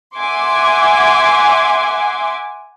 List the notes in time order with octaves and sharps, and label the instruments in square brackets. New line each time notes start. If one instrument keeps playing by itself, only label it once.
[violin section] E5 F#5 G#5 C6 D6